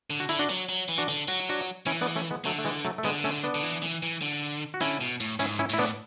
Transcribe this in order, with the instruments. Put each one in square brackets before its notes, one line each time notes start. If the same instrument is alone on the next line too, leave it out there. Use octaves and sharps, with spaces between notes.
[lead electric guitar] D3
[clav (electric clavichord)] F#4
[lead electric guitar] D3 [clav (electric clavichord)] E4
[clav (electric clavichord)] D4 F#4
[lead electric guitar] F#3
F#3
E3
[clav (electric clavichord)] D4 F#4
[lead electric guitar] D3
[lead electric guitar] F#3 [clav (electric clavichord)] F#4
[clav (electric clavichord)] D4 F#4
[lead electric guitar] E3 [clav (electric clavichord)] C#4 E4
[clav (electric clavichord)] B3 D4
A3 C#4
G#3 B3
[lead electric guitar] D3 [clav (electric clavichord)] F#3 A3
[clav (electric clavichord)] A3
E3 G#3
F#3 A3
A3
[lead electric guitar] D3 [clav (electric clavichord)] G#3 B3
[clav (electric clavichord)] A3 C#4
B3 D4
[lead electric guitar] D3
E3
E3
E3
D3
[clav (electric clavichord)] F#4
[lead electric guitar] D3 [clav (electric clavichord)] C#4 E4
[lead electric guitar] B2
A2
[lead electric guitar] G#2 [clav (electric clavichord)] C#4 E4
[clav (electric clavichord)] C#4 E4
[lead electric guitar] A2 [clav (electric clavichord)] E4
[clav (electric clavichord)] B3 D4